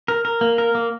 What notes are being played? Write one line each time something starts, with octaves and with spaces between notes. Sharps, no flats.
A#4
A#4
A#3
A#4
A#3